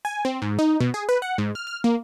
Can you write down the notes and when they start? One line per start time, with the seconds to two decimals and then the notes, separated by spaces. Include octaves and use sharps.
0.05 G#5
0.25 C4
0.42 G#2
0.59 D#4
0.80 B2
0.94 G#4
1.09 B4
1.22 F#5
1.38 G#2
1.55 F6
1.67 F6
1.84 A#3